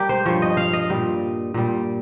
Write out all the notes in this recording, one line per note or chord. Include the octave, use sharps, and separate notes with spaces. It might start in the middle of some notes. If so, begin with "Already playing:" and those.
Already playing: G3 G4 A#4
C5
G2 F3 C#5
D#5
F5
D#5
A#2 G3
A#2 G3